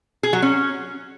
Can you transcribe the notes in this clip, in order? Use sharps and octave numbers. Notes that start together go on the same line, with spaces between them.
G#4
F#3
C#4